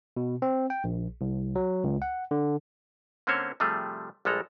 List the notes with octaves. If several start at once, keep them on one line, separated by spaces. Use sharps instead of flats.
B2
C4
G5
A#1
C2
F#3
C#2
F#5
D3
D3 A#3 C4 C#4 C5 C#5
C3 F3 G3 A3 G#4
A#1 G3 G#3 A4 A#5